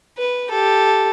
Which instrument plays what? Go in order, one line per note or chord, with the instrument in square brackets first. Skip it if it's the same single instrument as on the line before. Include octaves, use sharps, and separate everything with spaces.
[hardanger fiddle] B4
G4 A4